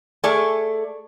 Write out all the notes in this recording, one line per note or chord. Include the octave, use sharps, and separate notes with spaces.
A3 G#4 A4 D5